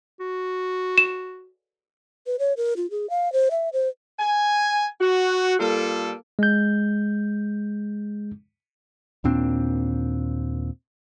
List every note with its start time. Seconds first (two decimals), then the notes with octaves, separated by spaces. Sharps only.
0.20 F#4
0.98 E7
2.26 B4
2.39 C#5
2.57 A#4
2.77 F4
2.90 G#4
3.10 F5
3.32 C5
3.51 E5
3.73 C5
4.19 G#5
5.00 F#4
5.59 G3 A#3 F4 A4
6.39 G#3 G6
9.24 D#2 A#2 C4 D4